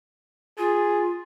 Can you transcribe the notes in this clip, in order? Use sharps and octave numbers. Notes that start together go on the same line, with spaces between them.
F4 G#4